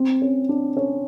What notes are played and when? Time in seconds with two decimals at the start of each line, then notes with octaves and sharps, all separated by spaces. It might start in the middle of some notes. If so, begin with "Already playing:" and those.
Already playing: C4
0.22 C#4
0.49 D4
0.77 C#4